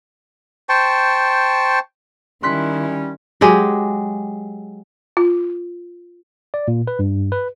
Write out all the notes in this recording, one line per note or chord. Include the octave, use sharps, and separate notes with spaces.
C5 G5 A5 C#6
D#3 G3 C#4 E4 C6 F#6 B6
F#3 G#3 G4 G#4
F4
D5
A#2
B4
G2
B4